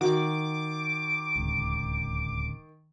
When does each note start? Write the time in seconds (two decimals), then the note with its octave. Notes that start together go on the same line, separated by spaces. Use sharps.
0.01 D#3 F#4 D6
1.36 D1 C#2